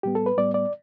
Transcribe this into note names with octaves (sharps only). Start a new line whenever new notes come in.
A2 G3 B3 G4
A4
B4
A2 G3 B3 D5
D5